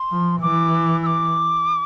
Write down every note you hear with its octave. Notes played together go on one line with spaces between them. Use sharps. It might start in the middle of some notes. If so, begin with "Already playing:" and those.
Already playing: C6
F3
E3 D6
E6
D6